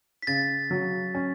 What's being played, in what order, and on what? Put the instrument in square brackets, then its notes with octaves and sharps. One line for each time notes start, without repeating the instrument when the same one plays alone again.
[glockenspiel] B6
[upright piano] C#3 [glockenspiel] A6
[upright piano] F#3
C#4